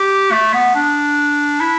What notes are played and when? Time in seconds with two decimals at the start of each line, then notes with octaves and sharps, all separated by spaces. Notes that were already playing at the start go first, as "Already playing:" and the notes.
Already playing: G4
0.31 A3
0.54 B3
0.75 D4
1.61 E4